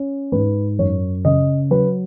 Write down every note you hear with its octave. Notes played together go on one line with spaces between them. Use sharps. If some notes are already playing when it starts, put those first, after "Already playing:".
Already playing: C#4
G#2 B4
F#2 C#5
C#3 D#5
F#3 B4